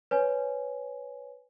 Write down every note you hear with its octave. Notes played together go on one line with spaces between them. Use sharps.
B4 C#5 G#5